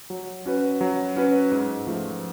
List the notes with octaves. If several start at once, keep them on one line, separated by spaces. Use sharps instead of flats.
F#3
C#4 F#4 B4
F#3
C#4 F#4 B4
G#2
F3 A3